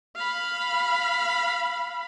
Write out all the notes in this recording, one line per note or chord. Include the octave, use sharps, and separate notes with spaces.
F5 B5